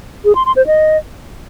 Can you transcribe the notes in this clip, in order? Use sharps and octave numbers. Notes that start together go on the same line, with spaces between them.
G#4
C6
C6
C5
D#5